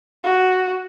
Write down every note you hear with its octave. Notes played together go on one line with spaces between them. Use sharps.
F#4